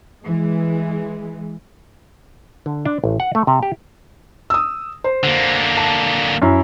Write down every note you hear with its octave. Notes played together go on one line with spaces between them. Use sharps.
E3 G#3
D3
D4
A1
F#5
A3
C3
G4
D#6 E6
C5
D3 A#3
A5
F#2 E4